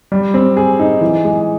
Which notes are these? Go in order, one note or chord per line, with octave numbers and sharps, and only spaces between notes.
G3
C4
G#4
D#4
E3
G#3